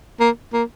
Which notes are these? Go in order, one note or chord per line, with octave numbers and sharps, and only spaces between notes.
A#3
A#3